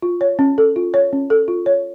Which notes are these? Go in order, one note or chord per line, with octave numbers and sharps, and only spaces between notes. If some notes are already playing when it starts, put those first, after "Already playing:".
F4
C#5
C#4
A4
F4
C#5
C#4
A4
F4
C#5